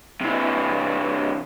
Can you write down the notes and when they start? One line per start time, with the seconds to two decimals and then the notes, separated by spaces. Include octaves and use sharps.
0.21 C3 E3